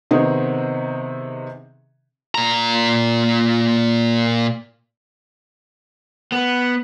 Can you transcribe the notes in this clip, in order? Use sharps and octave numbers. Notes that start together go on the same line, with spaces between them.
C3 D#3 B3 C4 D#4 G#4
A#2 A#5
B3